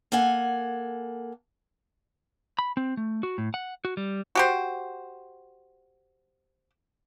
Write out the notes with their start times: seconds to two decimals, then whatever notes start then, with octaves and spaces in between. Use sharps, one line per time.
0.12 A#3 A4 F#5 G#5
2.59 B5
2.77 C4
2.97 A3
3.23 F#4
3.38 A2
3.54 F#5
3.85 F#4
3.97 G3
4.35 F#4 G4 C5